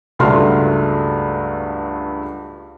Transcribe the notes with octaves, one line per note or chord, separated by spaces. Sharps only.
C#2 G2 A3 F#4 C6 F6